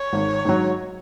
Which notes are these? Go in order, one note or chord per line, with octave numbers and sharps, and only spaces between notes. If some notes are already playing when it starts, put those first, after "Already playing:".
Already playing: C#5
G#1
G#2 F#3